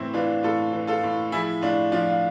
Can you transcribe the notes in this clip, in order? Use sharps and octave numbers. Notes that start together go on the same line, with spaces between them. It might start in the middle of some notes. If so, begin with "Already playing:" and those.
Already playing: A2 E3 C4 E4
E3 D4 F4
A2 F4 A4
E3
F4 A4
A2
F3 E4 G#4
A2 D4 F4
F3 D4 F4
F4